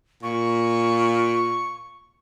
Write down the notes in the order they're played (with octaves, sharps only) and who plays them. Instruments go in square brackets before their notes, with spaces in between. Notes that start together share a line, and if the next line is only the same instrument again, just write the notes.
[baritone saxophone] A#2 [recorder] C#6